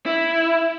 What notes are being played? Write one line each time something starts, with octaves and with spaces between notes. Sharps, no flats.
E4